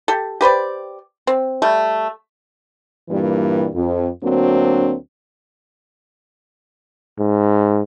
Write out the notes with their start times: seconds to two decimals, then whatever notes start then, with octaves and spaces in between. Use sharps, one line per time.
0.08 G4 A4
0.41 G4 B4 C5 D5
1.27 C4
1.62 G3 A3
3.09 G2 A#2 E3 G3 A#3
3.75 F2
4.24 D2 F#3 A#3 C4 D4
7.19 G#2